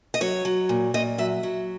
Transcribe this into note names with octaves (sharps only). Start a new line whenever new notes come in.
D#5
F#3 C#5
F#3
A#2
A#2 D#5
F#3 E5
F#3